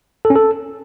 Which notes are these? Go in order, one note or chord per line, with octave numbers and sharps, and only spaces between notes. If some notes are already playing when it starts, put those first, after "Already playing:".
A4
C#4
A4